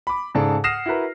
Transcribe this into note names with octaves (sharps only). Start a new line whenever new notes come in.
B5 D6
G#2 C#3 G#4 A4 D5 A5
F#5 D#6 F6 A#6 C7 E7
E4 F#4 A#4 B4 A#5